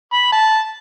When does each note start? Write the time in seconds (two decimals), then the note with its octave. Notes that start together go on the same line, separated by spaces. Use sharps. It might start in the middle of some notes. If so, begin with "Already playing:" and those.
0.13 B5
0.32 A5